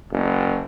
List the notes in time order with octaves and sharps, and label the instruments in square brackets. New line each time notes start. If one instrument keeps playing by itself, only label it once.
[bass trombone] F#1